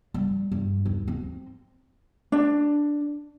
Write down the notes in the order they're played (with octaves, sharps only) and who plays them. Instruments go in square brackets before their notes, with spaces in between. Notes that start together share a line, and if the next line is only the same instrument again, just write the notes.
[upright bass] G3
G2
D#2
C4
[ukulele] D4